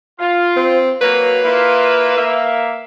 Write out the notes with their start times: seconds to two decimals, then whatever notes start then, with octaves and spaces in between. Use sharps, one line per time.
0.19 F4
0.56 C4
1.01 F#3 A#3 B4
1.44 A#3 E4 F4
2.17 A#3 E5